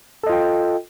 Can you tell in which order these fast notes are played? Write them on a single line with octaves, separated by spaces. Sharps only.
A4 D#5 F4 G5